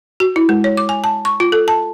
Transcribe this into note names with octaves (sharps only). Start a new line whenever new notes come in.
F#4
E4
G#3
C#5
D6
G#5
A5
C#6
F4
A4
A5